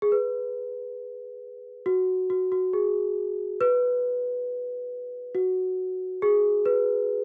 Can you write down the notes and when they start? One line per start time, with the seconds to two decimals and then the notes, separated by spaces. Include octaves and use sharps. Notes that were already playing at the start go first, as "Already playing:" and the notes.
0.02 G#4
0.12 B4
1.86 F#4
2.30 F#4
2.52 F#4
2.73 G#4
3.61 B4
5.35 F#4
6.22 G#4
6.66 B4